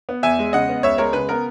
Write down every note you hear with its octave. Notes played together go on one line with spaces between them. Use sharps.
B3
E2 E5 G#5
G#3
C#3 D#5 F#5
B3
C#2 C#5 E5
G#3 A#4 C#5
C#3 B4
B3 A#4